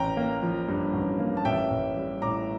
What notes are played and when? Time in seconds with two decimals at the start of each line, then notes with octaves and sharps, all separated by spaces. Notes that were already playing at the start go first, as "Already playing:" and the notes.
Already playing: A1 G5 A#5
0.17 A#3
0.43 F3
0.68 G2
0.94 A1
1.20 A#3
1.37 A5
1.45 A1 E5 G5
1.70 A1
1.97 G3
2.22 A2 A#5 D6